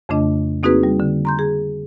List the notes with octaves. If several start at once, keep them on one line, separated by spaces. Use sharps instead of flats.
F2 C#3 A3 D4 D#5
A#3 C4 D#4 F#4 G#4 B4
G3
D3
A#5 C6 G6
G#4